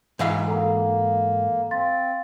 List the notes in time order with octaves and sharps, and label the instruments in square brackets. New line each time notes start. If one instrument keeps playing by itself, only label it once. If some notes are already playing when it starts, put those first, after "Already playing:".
[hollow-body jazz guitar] G#2 E3 F5
[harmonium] A#3 [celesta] A4 F#5 A#5
[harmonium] C4 [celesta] F5 C6 A6